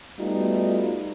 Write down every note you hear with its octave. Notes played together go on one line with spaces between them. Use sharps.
G3 A3 B3 D#4 F4 F#4